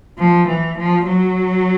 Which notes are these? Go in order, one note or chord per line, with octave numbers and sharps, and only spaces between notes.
F3
E3
F3
F#3